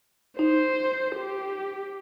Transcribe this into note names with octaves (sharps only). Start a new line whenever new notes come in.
D#4 C5
G4